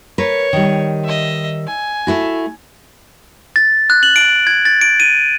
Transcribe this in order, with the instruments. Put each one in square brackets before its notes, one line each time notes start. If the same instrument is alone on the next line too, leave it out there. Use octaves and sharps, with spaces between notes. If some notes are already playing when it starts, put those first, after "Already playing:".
[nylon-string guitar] A#4 B4 [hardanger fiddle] C#5
[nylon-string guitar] D#3 G3
[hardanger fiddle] D#5 E5
G#5
[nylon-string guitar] A3 E4 F#4
[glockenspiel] A6
F#6
F#7
D7
G#6
A6
D7
D#7